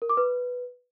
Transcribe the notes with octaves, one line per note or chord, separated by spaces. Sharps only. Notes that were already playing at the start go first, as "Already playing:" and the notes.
A#4
D6
B4